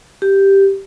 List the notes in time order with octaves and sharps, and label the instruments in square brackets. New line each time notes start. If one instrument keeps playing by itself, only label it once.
[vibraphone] G4